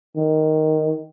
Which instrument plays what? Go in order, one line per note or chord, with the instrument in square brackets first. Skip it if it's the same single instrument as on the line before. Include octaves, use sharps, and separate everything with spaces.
[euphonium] D#3